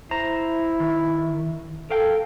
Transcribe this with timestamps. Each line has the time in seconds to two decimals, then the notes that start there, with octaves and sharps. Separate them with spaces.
0.11 E4 C5 A#5
0.80 D#3
1.91 A4 A#4 F5 G5